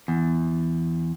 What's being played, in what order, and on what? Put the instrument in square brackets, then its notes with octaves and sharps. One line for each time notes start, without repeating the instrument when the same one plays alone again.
[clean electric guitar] E2